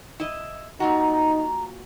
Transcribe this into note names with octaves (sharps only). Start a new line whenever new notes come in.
E4 D#5
A#2 D#4 F4 F#4 A#5